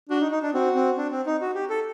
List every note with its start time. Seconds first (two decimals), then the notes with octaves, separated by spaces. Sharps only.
0.10 D4 F#4
0.21 D#4
0.32 D#4
0.43 D4
0.54 C4 F#4
0.75 C4
0.97 D4
1.11 C4
1.26 D#4
1.41 F#4
1.55 G4
1.70 A4